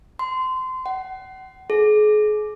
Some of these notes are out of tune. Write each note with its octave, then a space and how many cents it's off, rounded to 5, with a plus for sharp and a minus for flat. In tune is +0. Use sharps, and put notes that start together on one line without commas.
C6 -25
F#5 +35
G#4 +35